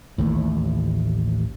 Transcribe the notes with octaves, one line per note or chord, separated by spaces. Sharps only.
A1 D#2 A2